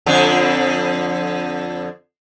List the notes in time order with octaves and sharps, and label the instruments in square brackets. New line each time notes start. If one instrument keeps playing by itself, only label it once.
[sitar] F2 D3